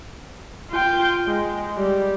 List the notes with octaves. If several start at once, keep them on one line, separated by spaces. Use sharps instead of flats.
F4 G5
G#3
G3